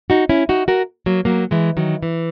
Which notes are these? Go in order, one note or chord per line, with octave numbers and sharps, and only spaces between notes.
D#4 F#4
C#4 E4
D#4 F#4
F#4 A#4
F#3 A#3
F#3 A#3
E3 G#3
D#3 F#3
E3